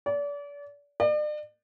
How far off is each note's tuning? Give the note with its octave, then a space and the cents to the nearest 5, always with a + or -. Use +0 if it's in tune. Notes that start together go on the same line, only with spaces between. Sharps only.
D5 -35
D5 +40